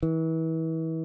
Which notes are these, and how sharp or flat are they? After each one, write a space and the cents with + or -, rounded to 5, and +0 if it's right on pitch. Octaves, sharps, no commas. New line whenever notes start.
E3 -35